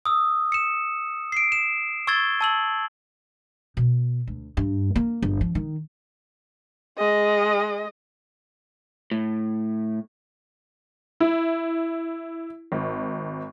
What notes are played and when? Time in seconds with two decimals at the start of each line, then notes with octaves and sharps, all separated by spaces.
0.06 D#6 E6
0.52 C#7 E7
1.32 C7 D7
1.52 E7
2.07 C#6 E6 G#6 A6 G7
2.41 A5 E6 F#7
3.77 B2
4.27 D2
4.57 G2
4.96 A#3
5.22 G1
5.41 F3
5.55 D#3
6.98 G#3 D#5
9.11 A2
11.20 E4
12.72 G#1